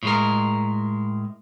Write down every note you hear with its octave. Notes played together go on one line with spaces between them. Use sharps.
A2 G#3 A#4